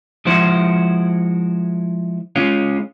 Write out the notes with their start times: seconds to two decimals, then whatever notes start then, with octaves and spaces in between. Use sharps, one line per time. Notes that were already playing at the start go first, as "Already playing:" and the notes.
0.25 F3 G#3 E4 F#4 C5
2.36 G#3 C#4 F4